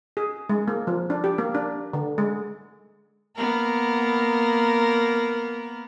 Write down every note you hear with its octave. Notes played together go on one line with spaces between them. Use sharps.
G#4
G#3
A#3
F3
D4
G4
A#3
D4
D3
G#3
A#3 B3 A#4